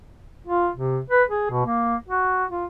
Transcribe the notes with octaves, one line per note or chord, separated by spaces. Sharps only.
F4
C3
B4
G#4
B2
A#3
F#4
F4